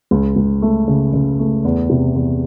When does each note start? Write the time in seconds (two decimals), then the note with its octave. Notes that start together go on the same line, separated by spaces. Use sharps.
0.11 C#2
0.36 C#2
0.62 A3
0.88 C#3
1.13 C#3
1.39 A3
1.65 E2
1.90 C3
2.15 E2